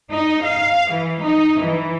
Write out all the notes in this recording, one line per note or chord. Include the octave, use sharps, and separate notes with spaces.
D#4
F5
E3
D#4
E3